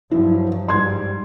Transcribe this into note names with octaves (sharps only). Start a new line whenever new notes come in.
G2 F3 F#3 E4
G#2 G3 C6 G#6